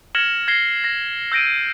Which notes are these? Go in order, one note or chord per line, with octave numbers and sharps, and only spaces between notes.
F6 G#6 A#6 C#7 E7 F#7
G#6 A#6 C7 G7
A#6
E6 G6 A#6 D7 D#7